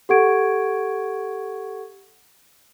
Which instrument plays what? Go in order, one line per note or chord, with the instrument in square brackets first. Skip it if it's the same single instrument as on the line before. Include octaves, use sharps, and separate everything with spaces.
[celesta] G4 A4 F#5 C#6 G#6 D7